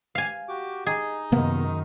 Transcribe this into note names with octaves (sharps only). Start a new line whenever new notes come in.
F5 G#5
F#4 G4 D6
D#4 G#4 D#5
F#2 C3 D#3 A#3 B3